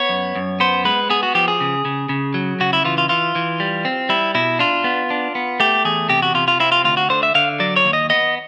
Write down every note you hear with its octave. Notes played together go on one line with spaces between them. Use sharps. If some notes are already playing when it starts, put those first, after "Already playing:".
Already playing: B3 C#5
F#2
F#2
B3 C5
G#3 B4
B3 G#4
F#4
F3 G4
G#4
C#3
C#3
C#3
F#3
C#3 F#4
E4
E3 F4
F4
E3 F4
E3
G3
C4
G3 E4
B2 E4
D4 F4
B3
D4
B3
A3 G4
E2 G#4
C3 G4
F#4
C3 F4
F4
C4 E4
F4
D2 F4
F#4
D3 C5
E5
D3 F5
F#3 D5
C#5
D#2
D#5
B3 D#5